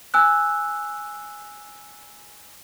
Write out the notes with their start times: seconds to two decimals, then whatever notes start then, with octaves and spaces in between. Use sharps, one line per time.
0.14 G#5 E6 F#6